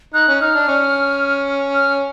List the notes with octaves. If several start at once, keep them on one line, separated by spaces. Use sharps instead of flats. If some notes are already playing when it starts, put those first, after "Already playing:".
D#4 F#6
C#4
D#4 F6
D4
C#4
F6